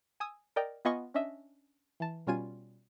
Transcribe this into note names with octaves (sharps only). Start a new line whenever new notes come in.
G#5 D#6 E6
A#4 D5 D#5 G5 A#5
B3 F4 D#5 G#5 B5 C#6
C#4 D4 D#5 E5
E3 A5
B2 G3 C#4 F4 G#5 D#7